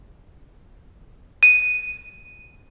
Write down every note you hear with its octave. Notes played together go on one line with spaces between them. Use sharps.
D#7